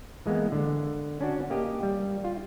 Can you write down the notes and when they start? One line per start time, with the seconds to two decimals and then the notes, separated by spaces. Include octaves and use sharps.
0.26 E3 G#3 A#3 B3
0.52 D3
1.21 C#4 D4 F#4
1.50 A#3 G4 D#5
1.83 G3
2.25 F4